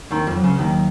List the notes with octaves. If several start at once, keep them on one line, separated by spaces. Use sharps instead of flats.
D#2 D#3 C4
F2 F3
F#3
C#2 C#3
D#2 D#3 A#3